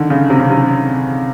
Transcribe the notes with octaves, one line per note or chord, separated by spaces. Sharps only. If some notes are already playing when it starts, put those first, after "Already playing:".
Already playing: D3 D#3
C#3
C3
C#3
C3